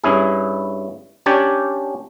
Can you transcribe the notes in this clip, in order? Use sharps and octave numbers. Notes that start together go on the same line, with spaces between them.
G2 C#4 E4 G#4
C#4 D4 G4 C#5 D5